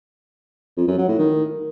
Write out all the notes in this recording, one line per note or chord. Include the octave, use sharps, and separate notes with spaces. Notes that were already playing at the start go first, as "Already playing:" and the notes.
F2
F#2
F#3
A2
D#3